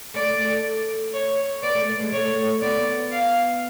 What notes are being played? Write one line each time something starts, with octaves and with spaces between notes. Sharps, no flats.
A3 D5
A3
C#5
B3 D5
A3
G#3
A3 C#5
B3 D5
F5